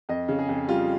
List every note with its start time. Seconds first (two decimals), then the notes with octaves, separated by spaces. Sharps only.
0.09 F2 D#5
0.28 C#3
0.39 G#4
0.49 F2
0.68 G3 F4